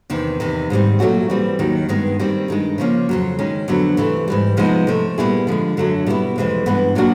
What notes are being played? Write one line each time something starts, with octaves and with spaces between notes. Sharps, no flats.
E2 C3 D#3
E2 C3 D#3
G#2 D#3 G3 C4
A#2 F#3 A3 C#4 F#4
E3 G3 C4
D#2 D#3 F#3
G2 D#3 G#3 B3
D#3 G3 C4
G2 D#3 G#3
C#3 F3 A#3 C#4
F2 C#3 F#3
D#3 G#3 C#4
F2 D3 F#3 B3
C3 E3 A3
G#2 E3 G3
C3 F3 G#3 B3 D#4
C3 F3 A3
A#2 G3 B3 E4 G#4
D3 F3 G#3
F#2 D3 F#3 A3
B2 G3 B3 E4
F2 C3 E3 G#3 C4
G2 E3 G#3 B3
A#2 F#3 A#3 D4 F#4